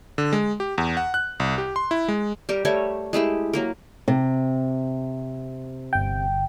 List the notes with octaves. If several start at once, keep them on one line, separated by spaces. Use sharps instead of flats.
D3
G#3
G4
E2
F#5
F#6
C2
G4
C6
E4
G#3
G3 G4 A#4
G3 A3 A#4 C#5
G#3 A3 E4 G4
F#3 A#3 A#4
C3
G1 G5